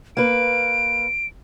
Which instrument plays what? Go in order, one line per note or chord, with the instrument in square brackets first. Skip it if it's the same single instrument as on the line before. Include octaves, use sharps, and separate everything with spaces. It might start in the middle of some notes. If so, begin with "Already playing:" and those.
[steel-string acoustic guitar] A#3 B4 [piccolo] D7